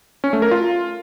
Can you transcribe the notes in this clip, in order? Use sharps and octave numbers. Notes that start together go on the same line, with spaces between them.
C#4
A3
A#4
F4